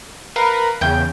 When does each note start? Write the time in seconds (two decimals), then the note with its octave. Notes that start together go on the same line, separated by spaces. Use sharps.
0.36 A#4 B4 F5
0.81 E2 C#3 G5 G6